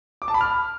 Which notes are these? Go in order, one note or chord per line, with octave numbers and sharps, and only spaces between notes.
D6
A5
B5
F6